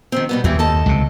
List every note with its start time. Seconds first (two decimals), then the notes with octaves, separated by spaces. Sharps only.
0.12 D#3 F3 C4
0.29 B2 G3 B3
0.44 D#2 E3 G4
0.59 A4 D#5 A5
0.86 C#2 C3